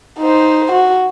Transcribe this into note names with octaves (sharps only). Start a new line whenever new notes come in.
D#4 C5
F#4